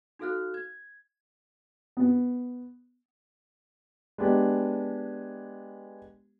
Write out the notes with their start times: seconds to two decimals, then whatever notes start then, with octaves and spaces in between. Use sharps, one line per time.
0.19 D#4 F#4 A4 F5 F6 F#6
0.54 G#6
1.97 B3
4.18 G#3 B3 D4 G4